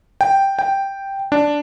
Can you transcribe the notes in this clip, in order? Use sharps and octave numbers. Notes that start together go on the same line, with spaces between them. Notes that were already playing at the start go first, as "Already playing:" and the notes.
G5
G5
D4